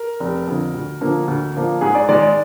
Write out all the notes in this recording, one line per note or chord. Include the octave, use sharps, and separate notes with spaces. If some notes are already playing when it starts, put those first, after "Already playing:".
Already playing: A#4
F1
F2 D3
D2
D3 F3 A#3 D4
D2
D3 F3 A#3 D4
G#2 G#4
D5
D#3 G#3 D5
D5